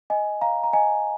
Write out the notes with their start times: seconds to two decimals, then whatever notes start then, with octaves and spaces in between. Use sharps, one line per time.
0.10 D#5 G#5
0.41 F5 A#5
0.64 A#5
0.73 D#5 G#5